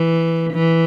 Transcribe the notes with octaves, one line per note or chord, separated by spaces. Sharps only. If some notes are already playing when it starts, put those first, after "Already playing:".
Already playing: E3
E3